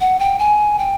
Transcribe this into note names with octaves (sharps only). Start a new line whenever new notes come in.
F#5
G5
G#5
G5